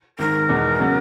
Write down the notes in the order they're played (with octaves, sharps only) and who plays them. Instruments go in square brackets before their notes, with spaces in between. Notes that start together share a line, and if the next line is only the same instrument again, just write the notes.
[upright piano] G#1 G#2 D#3 [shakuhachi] A#4
[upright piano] E2 B2 G#3 B3 D#4
C#3 F#3 B3